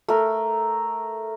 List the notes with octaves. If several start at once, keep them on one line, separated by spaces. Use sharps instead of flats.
A3 A#4